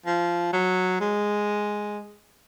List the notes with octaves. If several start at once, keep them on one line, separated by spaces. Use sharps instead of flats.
F3
F#3
G#3